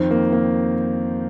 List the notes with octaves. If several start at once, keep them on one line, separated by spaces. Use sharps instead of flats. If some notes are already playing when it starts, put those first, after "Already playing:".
Already playing: F2 D#3 C4
A#3
A#3